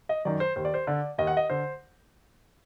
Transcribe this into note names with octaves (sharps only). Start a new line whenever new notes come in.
D#5
F#2 D#3 D5
C5
D#2 C5
D5
C5
D3 D5
D#2 D#5
F#5
D#5
D3 C5